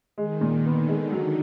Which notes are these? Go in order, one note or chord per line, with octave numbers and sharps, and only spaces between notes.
D#3 G#3
A#2
D3 B3
G#3
F#3